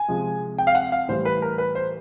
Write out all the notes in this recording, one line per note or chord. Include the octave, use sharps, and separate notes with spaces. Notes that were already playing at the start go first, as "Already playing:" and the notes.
Already playing: G#5
C3 F3 G#3
G5
F5
F#5
F5
A2 E3 G3 C5
B4
A#4
B4
C5